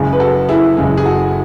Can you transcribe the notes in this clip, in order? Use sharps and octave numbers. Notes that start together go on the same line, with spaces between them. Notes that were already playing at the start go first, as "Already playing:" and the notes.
Already playing: F#1 F#2 C#3 G#3
B4
F#4 A4
E4 G#4
F#1 F#2 C#3 G#3
G#4
F#4 A4